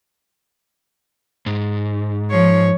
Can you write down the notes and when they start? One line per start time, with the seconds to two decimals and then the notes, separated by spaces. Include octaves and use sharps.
1.46 G#2
2.31 F3 C#5